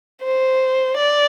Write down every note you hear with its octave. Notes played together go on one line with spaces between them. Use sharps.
C5
D5